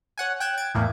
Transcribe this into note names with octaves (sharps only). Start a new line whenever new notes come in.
C#5 F#5 G#5
G5 F#6 G#6 E7
G#6 A6 D7
E2 A2 A#3